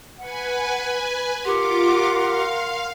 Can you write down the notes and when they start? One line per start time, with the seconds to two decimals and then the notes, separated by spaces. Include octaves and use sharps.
0.18 B4 F#5 G#5
1.45 F4 G4 A#4 F#5 C6 D6
2.07 F5